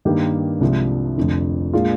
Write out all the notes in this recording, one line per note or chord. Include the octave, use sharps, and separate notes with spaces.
G2 D#3 A#3 D#4 G4
C2 C3 F3 G#3 D4
F1 F2 D3
A#2 G#3 D4 F4 G#4